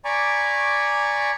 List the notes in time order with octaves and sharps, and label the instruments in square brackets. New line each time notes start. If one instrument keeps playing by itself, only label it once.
[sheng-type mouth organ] D5 G#5 A#5 B5 C#6 D6